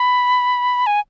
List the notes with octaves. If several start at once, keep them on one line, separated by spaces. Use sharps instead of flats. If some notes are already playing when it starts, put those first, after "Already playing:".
Already playing: B5
G#5